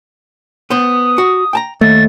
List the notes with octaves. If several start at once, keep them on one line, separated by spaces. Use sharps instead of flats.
B3 C5 D#6
F#4
G5 A5 A#5
D#2 A3 A6